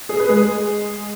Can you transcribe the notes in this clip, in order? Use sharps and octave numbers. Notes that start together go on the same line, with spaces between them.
G#4
B4
G#3 G#4